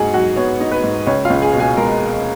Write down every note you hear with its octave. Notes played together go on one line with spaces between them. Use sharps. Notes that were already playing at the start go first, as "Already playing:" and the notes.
Already playing: G#2 D#4 F#4 G#4 F#5 G#5
F#3 F#4 F#5
B3 C#5
D#4
B4
G#2
C#2 C#5
C#2 F4 F5
G#4 G#5
B2
G#4 G#5
G#3 A#4 A#5